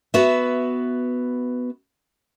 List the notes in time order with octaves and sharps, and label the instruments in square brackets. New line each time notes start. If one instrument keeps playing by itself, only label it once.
[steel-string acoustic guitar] B3 F#4 B4 E5